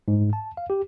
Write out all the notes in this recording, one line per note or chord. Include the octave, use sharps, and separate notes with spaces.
G#2
A5
F5
G4